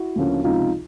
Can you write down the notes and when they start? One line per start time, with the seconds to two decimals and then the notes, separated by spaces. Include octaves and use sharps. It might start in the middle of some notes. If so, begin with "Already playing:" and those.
Already playing: E4 F#4
0.16 D2 C#3 F3 A#3 C#4
0.44 C#2 C3 F3 D#4 F4